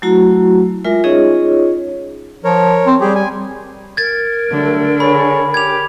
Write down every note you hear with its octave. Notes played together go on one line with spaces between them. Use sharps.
F#3 A3 E4 F#4 A#5
G#3 F4 A#4 E5
C#4 D#4 F4 G#4 C#5 D#5
F3 A#4 C#5
C4
G3 G4 G#4
G#5
A#4 G#6 A6
D3 F#3 G3 A3
G#4 C#5 B5
G4 G#6 F7